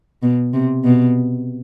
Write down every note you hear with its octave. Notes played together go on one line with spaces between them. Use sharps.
B2
C3
B2